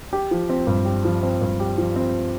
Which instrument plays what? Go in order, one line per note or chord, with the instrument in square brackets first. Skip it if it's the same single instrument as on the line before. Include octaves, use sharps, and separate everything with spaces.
[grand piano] G4
F3
C4
G2
G4
F3
C4
G2
G4
F3
C4